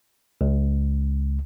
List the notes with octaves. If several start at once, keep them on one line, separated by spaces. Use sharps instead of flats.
C#2